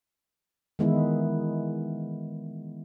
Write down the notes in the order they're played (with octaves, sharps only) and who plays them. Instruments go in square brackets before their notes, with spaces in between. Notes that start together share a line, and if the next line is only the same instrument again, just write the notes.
[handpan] D#3 E3 G#3 B3 E4